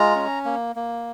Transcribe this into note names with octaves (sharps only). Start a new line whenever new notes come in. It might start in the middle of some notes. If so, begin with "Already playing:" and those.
Already playing: G#3 F4 A#5
C#4
A#3
A#3